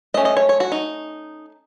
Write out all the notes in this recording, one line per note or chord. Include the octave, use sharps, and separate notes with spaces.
A3 C#4 D#5
D#5
C#5
C#5
F#4
D#4